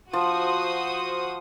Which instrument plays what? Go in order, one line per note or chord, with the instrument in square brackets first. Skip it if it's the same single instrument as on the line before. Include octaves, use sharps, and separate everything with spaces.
[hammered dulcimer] F3 [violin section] F#4 C5 D#6